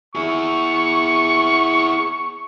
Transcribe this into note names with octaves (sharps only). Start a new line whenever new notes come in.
E4 G#4 C#6